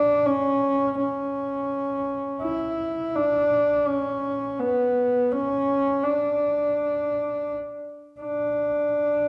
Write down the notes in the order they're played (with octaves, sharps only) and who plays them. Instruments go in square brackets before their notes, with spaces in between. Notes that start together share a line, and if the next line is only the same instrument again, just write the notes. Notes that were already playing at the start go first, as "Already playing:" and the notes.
Already playing: [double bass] D4
C#4
C#4
E4
D4
C#4
B3
C#4
D4
D4